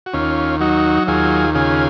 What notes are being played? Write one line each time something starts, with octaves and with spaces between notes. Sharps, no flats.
F#4
D#2 C#4 F4
F#3 D#4 F#4
D#2 F4 G#4
C#3 F4 G#4